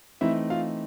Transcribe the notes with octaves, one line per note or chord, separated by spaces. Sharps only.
E3 A3 C4 D#4 E4 E5
F4 F5